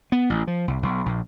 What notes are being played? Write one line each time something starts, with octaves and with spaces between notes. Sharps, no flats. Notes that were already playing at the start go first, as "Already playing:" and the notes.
B3
A1
F3
C2
B1
A#1